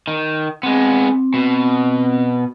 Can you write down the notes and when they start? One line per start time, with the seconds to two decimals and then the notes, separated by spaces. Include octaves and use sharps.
0.08 D#3
0.63 G#3 B3 C4
1.34 B2